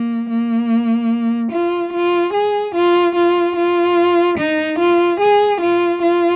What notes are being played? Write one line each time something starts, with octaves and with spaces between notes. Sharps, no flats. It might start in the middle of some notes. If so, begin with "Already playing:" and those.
Already playing: A#3
A#3
F4
F4
G#4
F4
F4
F4
D#4
F4
G#4
F4
F4